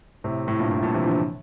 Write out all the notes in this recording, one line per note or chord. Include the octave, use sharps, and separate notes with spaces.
A2 C3
A2
G2 A#2
A2
G2 A#2
C3 E3
D3 F3